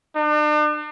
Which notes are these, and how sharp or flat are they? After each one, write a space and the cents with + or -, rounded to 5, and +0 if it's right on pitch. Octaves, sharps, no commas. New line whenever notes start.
D4 +40